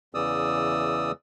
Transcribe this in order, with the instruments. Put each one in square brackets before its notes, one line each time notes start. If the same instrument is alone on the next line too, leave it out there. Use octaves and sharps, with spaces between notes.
[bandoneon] E2 C#3 E3 D5 D#6 E6